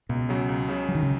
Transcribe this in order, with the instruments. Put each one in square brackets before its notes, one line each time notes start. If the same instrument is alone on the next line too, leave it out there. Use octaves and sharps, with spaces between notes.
[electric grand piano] C#2 [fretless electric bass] B2
[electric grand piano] C#3 F#3
C#2
C#3 F#3
[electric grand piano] C#2 [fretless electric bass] F#3
[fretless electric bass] D#3
C#3